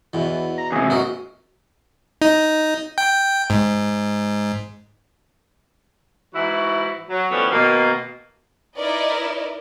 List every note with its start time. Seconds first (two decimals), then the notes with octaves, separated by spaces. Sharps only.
0.13 E2 B2 E3
0.58 A#5
0.72 D#2 C3 G#4
0.90 F#4 A#4 D#5
2.22 D#4
2.98 G5
3.50 G#2
6.34 G#2 E3 E4 F#4
7.09 F#3
7.30 E3 F3 G3 A3 B3 C#4
7.52 B2 D#3 A#3
8.75 D#4 E4 A#4 B4 D5 D#5